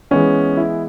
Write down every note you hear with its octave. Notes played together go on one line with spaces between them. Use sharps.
E3 G#3 B3 C#4
E4